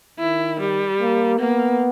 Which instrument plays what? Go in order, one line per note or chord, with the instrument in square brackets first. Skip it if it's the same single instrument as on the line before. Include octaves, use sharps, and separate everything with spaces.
[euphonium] D#3 [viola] E4
[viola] G3
[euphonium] A#3
[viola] A#3 [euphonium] B3